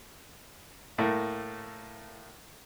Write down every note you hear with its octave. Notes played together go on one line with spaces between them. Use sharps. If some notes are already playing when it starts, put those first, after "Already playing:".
A2 A3 A#3